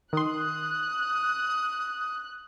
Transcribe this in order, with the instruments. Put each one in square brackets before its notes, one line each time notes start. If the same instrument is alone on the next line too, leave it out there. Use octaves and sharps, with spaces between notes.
[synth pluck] D#3 C6 [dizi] D#6 [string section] F#6